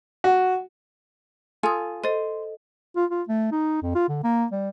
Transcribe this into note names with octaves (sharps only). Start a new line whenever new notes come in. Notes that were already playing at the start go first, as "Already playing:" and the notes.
F#4
F4 A4 G#5 C6 D#6
A4 C5 D#5
F4
F4
A3
D#4
F2
F4
D3
A#3
G3